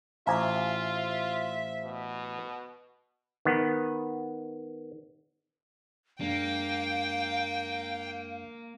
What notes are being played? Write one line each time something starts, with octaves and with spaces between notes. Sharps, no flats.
A1 F4 C5 E5 F5 G#5 A#5
B2
D#3 B3
F#2 G#3 A#3 D4 F5 G5